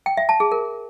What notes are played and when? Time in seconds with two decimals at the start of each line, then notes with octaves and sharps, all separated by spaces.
0.06 G5
0.17 E5
0.29 A5
0.40 G#4
0.52 A#4